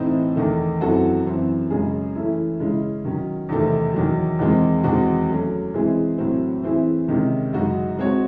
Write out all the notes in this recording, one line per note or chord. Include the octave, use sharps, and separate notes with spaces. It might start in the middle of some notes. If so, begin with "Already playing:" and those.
Already playing: A2 E3 C4 D#4
E2 D#3 A3
F#2 E3 C4 F#4 A4
F#2 E3 C4
F#2 C#3 G#3 C#4 G#4
E3 A3 C#4 E4
C#3 G#3 C#4 E4
D#3 F#3 C#4
E2 C3 D#3 A3 C4
E2 D#3 F#3
E2 D#3 G#3 C4
E2 D#3 G#3 C4 F#4
F#3 A3 C#4
E3 G#3 C4 E4 G#4
A2 F#3 C4
E3 C4 E4 G#4
C3 D#3 G#3 C#4
F#2 C#3 G#3 D#4 F#4
G#3 C4 F#4 C#5